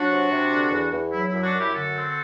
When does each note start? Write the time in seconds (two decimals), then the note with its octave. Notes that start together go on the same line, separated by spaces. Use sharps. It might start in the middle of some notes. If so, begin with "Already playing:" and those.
Already playing: F#3 D4 F#4
0.10 C3
0.31 C3
0.51 D3
0.72 E2
0.92 E2
1.13 F#3 E4
1.28 E4
1.33 F#2
1.43 D4 F#4
1.53 F#2
1.59 E4 G4
1.74 D3 F#4 A4
1.95 C4